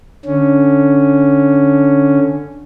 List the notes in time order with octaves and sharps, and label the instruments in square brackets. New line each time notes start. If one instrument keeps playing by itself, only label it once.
[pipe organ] D3 C#4